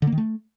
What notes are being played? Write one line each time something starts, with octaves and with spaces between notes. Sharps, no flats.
D3
A#3
D#3
A3